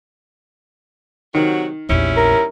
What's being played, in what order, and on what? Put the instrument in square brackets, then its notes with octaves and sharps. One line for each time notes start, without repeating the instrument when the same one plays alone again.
[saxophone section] C3 F#3 F#4 [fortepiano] D#3
[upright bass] A#1 E2 [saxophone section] G3 C#4 E4
[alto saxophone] A#4